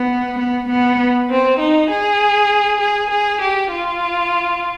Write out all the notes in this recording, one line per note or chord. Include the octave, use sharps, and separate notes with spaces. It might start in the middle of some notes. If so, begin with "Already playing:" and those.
Already playing: B3
B3
B3
C4
D#4
G#4
G#4
G#4
G4
F4